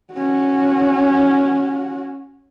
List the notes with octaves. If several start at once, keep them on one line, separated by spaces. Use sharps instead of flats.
C#4 F#4